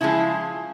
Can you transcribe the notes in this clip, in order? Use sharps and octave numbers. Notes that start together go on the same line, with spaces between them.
C#3 F3 G#3 E4